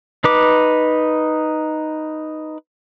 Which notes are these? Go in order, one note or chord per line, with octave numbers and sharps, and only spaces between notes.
D#4 B4 D6